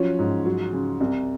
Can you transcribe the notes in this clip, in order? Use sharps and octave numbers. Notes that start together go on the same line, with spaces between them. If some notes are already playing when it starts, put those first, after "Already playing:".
Already playing: F3 F#3 C#4
G#2
F#3
C#3
C2